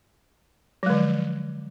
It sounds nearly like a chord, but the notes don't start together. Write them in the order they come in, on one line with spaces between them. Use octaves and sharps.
F#3 G#3 D3 F3